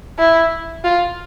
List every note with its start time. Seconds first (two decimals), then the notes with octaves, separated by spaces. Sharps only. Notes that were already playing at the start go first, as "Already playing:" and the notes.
0.19 E4
0.84 F4